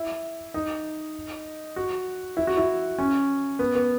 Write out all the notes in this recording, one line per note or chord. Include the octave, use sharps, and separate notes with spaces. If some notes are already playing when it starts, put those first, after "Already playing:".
Already playing: E4
D#4
F#4
E4
F#4
E4
C#4
B3
B3